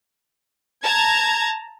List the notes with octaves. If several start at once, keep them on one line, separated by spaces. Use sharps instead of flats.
A5 A#5 G#6